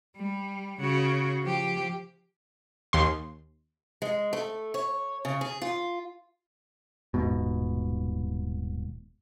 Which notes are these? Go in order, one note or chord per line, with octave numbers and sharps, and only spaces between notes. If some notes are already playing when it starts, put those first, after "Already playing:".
G3
C#3 F#4
F3 G4
D#2 C6
G#3
A3
C#5
C#3
G#4
F4
D#1 G#2 B2